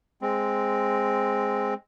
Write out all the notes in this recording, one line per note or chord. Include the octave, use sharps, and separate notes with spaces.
G#3 C4